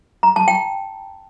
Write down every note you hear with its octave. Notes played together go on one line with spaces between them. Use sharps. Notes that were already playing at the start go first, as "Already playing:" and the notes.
A#5
A5
G5